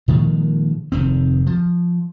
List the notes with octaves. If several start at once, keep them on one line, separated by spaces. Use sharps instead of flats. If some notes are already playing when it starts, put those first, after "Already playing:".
A#2 D#3 F3 G#3
F1 D#3 C4
F3